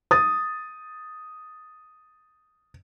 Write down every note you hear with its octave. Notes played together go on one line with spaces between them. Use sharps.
D#6 A6